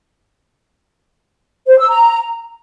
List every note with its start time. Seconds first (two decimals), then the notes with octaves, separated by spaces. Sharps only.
1.68 C5
1.79 E6
1.90 A#5